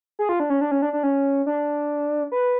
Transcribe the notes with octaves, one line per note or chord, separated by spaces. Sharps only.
G#4
F4
D4
C#4
D4
C#4
D4
D4
C#4
D4
B4